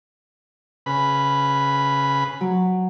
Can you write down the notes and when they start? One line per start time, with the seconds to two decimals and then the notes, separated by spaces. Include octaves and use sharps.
0.86 C#3 B4 B5
2.41 F#3